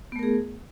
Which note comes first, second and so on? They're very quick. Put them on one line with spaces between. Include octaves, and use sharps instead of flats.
B3 A3 A#4 G#4